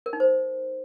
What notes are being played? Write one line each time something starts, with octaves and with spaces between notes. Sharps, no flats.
A#4
D#4
C5